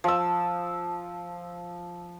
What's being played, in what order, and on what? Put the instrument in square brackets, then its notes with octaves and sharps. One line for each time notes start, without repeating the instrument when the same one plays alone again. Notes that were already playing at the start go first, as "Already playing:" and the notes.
[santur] F3 E6